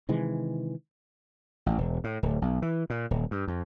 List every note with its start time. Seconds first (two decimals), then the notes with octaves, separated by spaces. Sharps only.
0.09 C3 D#3 E3 G#3
1.66 A1
1.78 E1
2.04 A2
2.23 D1
2.42 B1
2.62 E3
2.90 A#2
3.11 D#1
3.31 G2
3.48 F2